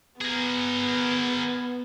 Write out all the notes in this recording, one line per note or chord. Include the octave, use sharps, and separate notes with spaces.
B3 G#4 A#4